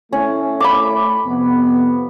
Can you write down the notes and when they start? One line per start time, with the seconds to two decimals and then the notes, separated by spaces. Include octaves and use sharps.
0.13 A3 C#4 E4
0.60 B5 D6
1.26 F2 C3 B3